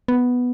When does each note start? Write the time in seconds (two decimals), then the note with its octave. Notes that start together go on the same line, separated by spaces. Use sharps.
0.08 B3